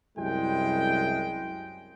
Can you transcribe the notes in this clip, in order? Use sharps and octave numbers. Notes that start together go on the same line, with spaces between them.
C2 F#2 G#3 E4 G5